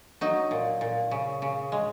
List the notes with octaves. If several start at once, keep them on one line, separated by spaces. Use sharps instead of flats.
F#3 D#4
A#2
A#2
C#3
C#3
G#3